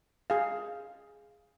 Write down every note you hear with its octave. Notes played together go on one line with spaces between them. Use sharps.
G#4 F5